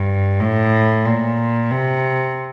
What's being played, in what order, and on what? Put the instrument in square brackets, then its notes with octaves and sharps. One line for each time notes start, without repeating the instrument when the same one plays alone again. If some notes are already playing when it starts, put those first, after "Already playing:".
Already playing: [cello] G2
A2
A#2
C3